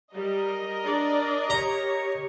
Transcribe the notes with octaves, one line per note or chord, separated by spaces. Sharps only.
G3 A#4 D#5
D4 D5
G4 C#5 A#5